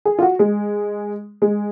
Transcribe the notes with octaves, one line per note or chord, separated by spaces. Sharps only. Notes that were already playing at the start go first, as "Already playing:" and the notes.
G#4
F4
F#4
G#3
G#3